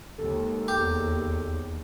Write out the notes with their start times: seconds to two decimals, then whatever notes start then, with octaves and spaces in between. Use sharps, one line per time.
0.18 D#2 G#3 A4
0.68 E2 G4